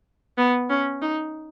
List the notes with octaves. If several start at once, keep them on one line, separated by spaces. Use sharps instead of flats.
B3
C#4
D#4